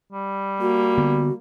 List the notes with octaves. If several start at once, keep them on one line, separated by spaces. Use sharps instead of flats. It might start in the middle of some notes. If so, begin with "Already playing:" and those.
G3
A#3 F#4
D3 B3